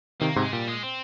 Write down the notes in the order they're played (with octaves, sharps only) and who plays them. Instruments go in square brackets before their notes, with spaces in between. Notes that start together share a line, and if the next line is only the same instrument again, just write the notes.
[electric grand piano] C3 D#3 [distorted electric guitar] A#3
[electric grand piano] G#2 C3 [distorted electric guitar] G#3
[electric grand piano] A#2 [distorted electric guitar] G3
[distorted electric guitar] G#3
C4